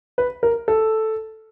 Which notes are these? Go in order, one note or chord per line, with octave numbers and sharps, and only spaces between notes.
B4
A#4
A4